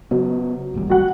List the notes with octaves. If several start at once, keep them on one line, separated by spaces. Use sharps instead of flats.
C#3 F#3 B3
D#1 A1 G3
F#4 F#5